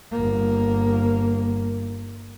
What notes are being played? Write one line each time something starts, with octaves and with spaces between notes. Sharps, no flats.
G1 A#3